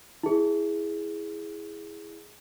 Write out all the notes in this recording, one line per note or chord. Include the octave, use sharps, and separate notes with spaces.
E4 G#4